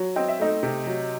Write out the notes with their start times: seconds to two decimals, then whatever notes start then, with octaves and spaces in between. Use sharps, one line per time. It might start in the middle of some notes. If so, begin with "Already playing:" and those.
Already playing: F#3
0.16 C4 D#5
0.28 E5
0.40 A3 D#4 D#5
0.63 C3
0.86 F#3